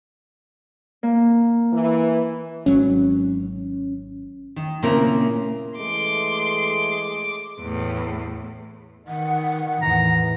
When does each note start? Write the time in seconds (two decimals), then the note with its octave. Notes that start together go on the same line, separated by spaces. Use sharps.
1.03 A#3
1.73 E3
2.66 G#1 F#3 C#4
4.56 D#3
4.83 A#2 C#3 A#3 C4 E4 A#4
5.78 E3 G#3 A3 C6 D6
7.61 E2 A2
9.08 D#3 F#5
9.82 E2 A2 A#5